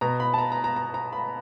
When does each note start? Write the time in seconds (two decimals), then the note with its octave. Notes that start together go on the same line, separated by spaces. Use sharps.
0.01 B2 A#5
0.20 B5
0.34 A5
0.38 A#5
0.52 A#5
0.64 A#5
0.76 A#5
0.94 A#5
1.13 B5